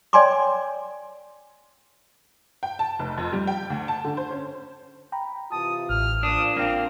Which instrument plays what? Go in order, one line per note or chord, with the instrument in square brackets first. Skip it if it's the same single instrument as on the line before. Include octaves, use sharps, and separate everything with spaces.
[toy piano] C#5 D5 G5 G#5 C6 D6
[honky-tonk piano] G5
A5
F1
F2
G3
G5
D2
A5
D3
C5
C#4
[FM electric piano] G5 A#5 B5
[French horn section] C3 E3 F4 [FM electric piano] A5 [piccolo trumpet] D#6
[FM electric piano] A1 [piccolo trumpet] F6
[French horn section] A#2 F3 [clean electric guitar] D4 [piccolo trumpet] D#6
[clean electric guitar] A#3 C4 [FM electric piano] D4 [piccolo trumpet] F6